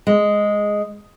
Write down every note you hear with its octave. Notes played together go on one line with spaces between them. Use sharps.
G#3